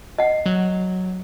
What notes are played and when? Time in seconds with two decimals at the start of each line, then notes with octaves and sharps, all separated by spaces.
0.18 D#5 F#5
0.46 F#3